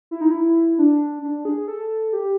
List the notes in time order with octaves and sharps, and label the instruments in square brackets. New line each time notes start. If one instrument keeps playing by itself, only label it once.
[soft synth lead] E4
D#4
E4
D4
D4
G#4
A4
G4